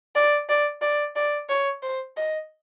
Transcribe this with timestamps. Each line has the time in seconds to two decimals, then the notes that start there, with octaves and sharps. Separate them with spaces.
0.15 D5
0.49 D5
0.82 D5
1.16 D5
1.49 C#5
1.82 C5
2.17 D#5